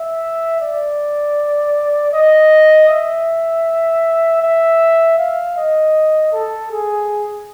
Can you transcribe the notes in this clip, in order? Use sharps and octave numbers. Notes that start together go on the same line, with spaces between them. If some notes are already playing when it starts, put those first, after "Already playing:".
Already playing: E5
D5
D#5
E5
E5
F5
D#5
A4
G#4